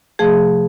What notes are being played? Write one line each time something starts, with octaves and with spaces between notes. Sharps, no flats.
C3 F3 A3 G#4